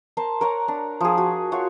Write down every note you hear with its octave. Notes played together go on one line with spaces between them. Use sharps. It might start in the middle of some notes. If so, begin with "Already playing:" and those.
A#4 C5 A5
A#4 C#5 F#5 A#5
D4
F3 G#4
F#4
F4 F#4 C#5